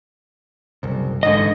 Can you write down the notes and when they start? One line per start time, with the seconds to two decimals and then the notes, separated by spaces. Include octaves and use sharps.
0.83 F#1 C2
1.23 A1 G#2 D3 D#5